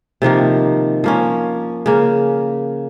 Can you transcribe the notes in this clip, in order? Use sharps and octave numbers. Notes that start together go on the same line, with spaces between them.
C3 D#3 F3 A#3
F3 A#3 C#4
C#3 A#3